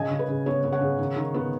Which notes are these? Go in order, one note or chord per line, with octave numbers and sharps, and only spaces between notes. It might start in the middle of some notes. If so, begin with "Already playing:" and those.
Already playing: C#3 D#5 G#5
C#3
B4
C#3
B3 C#5
B3
C#5 F#5
C#3
D#3
D#3
B3